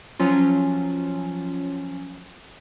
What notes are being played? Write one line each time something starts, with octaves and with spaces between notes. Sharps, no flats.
F3 F#3 C#4 F4